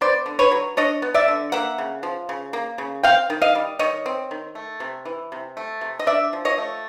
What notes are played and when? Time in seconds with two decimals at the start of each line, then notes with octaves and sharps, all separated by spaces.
0.01 B3 C5 D5
0.26 D3
0.39 B4 C#5
0.52 F#3
0.77 D4 C#5 D#5
1.02 B3
1.14 D5 E5
1.28 D3
1.52 A#3 E5 F#5
1.78 C#3
2.03 F3
2.29 C#3
2.53 A#3
2.78 C#3
3.03 C4 F5 G5
3.30 D#3
3.42 D#5 F5
3.55 G3
3.79 D#3 C#5 D#5
4.06 C4
4.31 D#3
4.55 A3
4.80 C3
5.05 E3
5.32 C3
5.57 A3
5.81 C3
5.99 D#5
6.06 D4 D5 E5
6.33 F3
6.45 C#5 D#5
6.58 A3